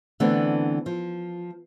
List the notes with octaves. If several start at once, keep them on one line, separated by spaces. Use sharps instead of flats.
D3 E3 A3 B3 C4 D4
F3